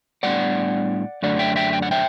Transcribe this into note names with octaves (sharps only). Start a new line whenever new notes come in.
A2 G3 B3 D4 D5 F#5
F#2 D3 A3 D4 D5 F#5
E5 G5
E5 G5
G5
F#5
E5 G5